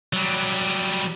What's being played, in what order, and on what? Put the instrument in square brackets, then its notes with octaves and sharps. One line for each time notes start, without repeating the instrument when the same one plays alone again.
[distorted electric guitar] F#3 G3